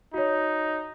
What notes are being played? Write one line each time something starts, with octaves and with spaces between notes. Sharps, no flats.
D#4 F#4 C#5